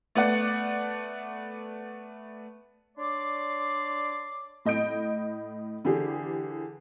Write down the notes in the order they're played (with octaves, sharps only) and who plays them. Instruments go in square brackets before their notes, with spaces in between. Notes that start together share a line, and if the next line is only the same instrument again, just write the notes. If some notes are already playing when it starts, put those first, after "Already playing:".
[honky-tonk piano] A3 B3 D5 F#5
[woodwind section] D4 C#5 D5 C6 D6
[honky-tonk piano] A2 D#5 G6 D7
D3 E3 G4 G#4